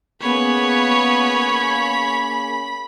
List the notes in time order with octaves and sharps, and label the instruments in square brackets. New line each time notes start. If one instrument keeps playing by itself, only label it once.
[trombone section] A#3 C#4 G#4 [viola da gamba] B3 [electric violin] C#5 [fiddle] B5